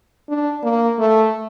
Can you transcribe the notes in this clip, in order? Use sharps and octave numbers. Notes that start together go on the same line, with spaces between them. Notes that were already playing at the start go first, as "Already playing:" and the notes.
D4
A#3
A3